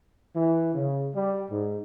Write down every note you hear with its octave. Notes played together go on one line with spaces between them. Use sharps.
E3
C#3
G3
G#2